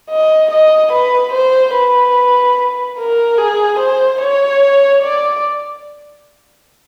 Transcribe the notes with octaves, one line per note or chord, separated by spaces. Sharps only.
D#5
D#5
B4
C5
B4
A#4
G#4
C5
C#5
D5